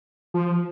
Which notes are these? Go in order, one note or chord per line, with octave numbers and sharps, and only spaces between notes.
F3